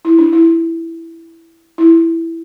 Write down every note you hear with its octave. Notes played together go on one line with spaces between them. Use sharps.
E4
D4
E4
E4